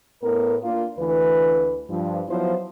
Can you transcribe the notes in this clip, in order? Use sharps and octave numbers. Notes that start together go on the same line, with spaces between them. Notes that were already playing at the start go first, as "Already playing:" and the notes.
A2 B3 A#4
A#3 D4 F4
D2 E3 B4
G2 F3
F3 F#3 B3 E4 C5